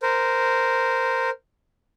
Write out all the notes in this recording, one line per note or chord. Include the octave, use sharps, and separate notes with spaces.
A#4 C5